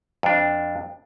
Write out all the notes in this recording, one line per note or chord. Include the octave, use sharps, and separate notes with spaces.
F2 D4